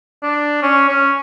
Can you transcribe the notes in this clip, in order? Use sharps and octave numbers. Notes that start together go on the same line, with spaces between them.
D4
C#4
C#4